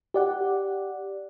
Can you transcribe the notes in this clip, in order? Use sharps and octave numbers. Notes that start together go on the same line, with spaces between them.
G4 D5 F#5